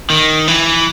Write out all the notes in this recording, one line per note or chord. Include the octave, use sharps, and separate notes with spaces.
D#3
E3